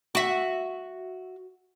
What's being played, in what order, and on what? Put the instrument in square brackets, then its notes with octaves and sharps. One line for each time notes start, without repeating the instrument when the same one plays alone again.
[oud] F#4 E5